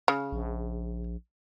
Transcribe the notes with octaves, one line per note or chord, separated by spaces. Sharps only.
C#3
A#1